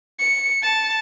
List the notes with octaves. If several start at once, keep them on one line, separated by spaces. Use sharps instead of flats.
C#7
A5